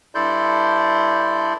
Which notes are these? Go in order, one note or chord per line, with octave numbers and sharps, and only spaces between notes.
G2 E4 A4 D5 C6 G6